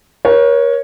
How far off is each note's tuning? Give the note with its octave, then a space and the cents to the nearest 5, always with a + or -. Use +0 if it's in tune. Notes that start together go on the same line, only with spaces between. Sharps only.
A#4 +35 C#5 +0